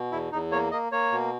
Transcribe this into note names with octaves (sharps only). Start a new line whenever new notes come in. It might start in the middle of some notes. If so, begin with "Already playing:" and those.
Already playing: B2
E2 E4
E2 D#4
A#3 C#5
A#3 D#5
A#3 C#5
B2